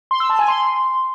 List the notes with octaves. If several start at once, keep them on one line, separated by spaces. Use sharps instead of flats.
C6
E6
A5
G#5
C6